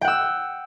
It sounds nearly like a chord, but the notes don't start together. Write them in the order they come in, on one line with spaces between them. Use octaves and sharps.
G5 F#5 E6